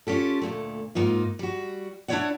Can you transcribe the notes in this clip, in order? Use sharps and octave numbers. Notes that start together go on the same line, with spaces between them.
C#4 F4 G4 A4
D2 A#2 A3
G#2 A#3 D#4 F4
G3 F#4
D4 E4 F4 C#5 D5 F#5